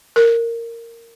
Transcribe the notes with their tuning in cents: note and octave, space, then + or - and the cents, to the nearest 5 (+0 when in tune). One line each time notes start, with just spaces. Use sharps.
A#4 -10